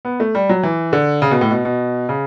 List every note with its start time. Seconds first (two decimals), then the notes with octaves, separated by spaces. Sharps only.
0.05 B3
0.20 A3
0.35 G3
0.49 F#3
0.63 E3
0.93 D3
1.22 C#3
1.31 B2
1.41 A2
1.51 B2
1.65 B2
2.09 C#3